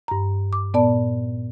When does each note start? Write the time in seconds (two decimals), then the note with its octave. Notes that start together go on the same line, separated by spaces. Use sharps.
0.08 G2 A#5
0.53 D6
0.74 A#2 B3 D5 A5